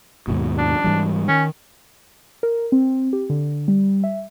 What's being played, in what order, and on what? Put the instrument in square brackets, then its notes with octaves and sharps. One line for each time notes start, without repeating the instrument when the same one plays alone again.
[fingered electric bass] D#2 G#2 B2
[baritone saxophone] D4
[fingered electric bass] G#2 E3 G3
[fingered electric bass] D#3 [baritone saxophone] C#4
[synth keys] A#4
C4
G4
D3
G3
E5